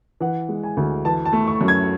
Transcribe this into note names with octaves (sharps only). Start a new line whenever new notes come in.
E3 F#5
G#3
G#5
D2
E3 A5
A5
A3
C#6
F#2
G#6